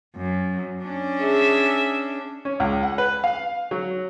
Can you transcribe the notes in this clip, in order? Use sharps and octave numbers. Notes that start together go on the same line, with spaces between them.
F#2
C#4 D4
G#4 E5
C#4
C#2
F#5
B4
F5
F#3